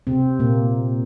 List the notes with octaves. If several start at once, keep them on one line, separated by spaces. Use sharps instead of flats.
C3 C4
A#2 A#3